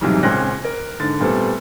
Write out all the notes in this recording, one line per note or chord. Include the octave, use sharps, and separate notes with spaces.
B1 G#2 C3 E3 F#3 G3
C#2 A#2 C4 C#4 F#6 A#6
A#4
G#2 D3 A6
A#2 G3 A3 B3 C4